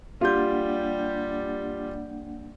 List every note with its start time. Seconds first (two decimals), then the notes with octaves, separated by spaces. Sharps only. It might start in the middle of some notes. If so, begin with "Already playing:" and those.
0.21 G3 A#3 D4 F4 G4 F#5 G6